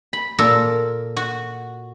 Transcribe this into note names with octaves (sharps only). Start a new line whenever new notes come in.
B5
A#2 A#3 A4 A#4
F#4